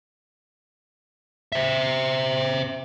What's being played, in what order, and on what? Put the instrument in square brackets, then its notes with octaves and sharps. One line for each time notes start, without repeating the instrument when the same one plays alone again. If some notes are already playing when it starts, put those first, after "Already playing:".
[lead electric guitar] C5 E5